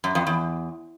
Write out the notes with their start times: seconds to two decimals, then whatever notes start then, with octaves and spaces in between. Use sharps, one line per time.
0.04 F#2
0.15 F2
0.27 E2